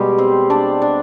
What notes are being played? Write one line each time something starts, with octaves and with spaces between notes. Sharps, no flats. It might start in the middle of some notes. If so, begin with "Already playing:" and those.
Already playing: B2 G3 G#3 G4
C4 C5
D4 D5
D4 D5